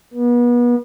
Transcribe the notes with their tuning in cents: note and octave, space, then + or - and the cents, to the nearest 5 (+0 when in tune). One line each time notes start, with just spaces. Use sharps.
B3 -35